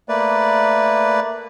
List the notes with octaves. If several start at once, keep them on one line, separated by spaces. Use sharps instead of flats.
A3 A#3 B4 D5